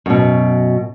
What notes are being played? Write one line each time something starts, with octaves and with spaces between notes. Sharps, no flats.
F#2 B2